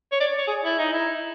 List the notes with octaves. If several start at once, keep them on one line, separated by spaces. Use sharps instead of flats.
C#5
D5
C#5
G#4
E4
D#4
E4